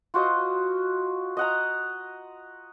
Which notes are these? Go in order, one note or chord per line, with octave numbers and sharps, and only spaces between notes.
F4 F#4 C5 D#5
D#5 F#5 A#5